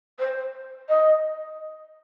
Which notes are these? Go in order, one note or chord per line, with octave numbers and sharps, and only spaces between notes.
C5
D#5